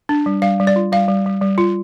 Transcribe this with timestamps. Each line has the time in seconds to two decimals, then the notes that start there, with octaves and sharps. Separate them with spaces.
0.09 D4
0.26 G3
0.42 G3 F5
0.60 G3
0.67 D5
0.76 F4
0.92 G3 F5
1.08 G3
1.26 G3
1.42 G3
1.58 F4